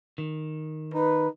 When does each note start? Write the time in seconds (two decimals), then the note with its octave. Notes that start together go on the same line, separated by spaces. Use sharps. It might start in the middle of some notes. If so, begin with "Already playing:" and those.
0.18 D#3
0.94 D#4 B4